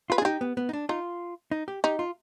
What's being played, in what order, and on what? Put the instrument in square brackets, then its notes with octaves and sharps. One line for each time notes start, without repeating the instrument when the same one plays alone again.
[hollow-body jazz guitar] F4 [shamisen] B4
[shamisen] G#4
[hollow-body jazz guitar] D4
[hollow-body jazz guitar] D#4 [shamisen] G4
[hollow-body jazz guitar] B3
B3
D#4
D4
[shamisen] D#4 [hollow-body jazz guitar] F4
[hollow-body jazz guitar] D#4
G4
[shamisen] D#4 [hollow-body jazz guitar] G4
[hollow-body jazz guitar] F4